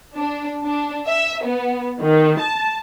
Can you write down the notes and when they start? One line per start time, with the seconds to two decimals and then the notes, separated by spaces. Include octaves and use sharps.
0.16 D4
0.64 D4
1.07 E5
1.44 B3
2.01 D#3
2.41 A5